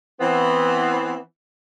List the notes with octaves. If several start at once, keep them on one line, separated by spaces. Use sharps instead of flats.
E3 B3 C4